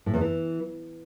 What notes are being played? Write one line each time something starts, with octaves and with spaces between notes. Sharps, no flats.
A2
E2
E3